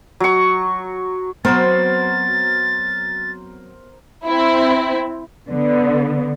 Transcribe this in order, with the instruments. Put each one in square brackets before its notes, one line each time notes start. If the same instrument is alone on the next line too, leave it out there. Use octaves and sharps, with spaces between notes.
[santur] F#3 C#6
[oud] F#3 C4 [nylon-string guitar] B3 [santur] A#4 C5 [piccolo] A6
[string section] C4 E4
D3 B3